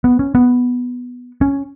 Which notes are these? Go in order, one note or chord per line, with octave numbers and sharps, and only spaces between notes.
B3
C#4
B3
C#4